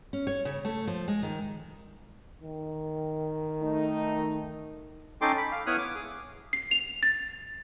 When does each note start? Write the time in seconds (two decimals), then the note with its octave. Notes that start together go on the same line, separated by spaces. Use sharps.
0.13 C#4
0.27 C#5
0.45 C#3
0.65 A3
0.87 F3
1.08 G#3
1.22 D#3
2.43 D#3
3.62 A3 D#4
5.22 C#4 D#4 A4 G5 C6 D6
5.38 B5
5.52 F5
5.67 B3 E4 C#5 D#6 F6 F#6
5.78 D6
5.95 G#4
6.53 C7
6.71 F7
7.03 A6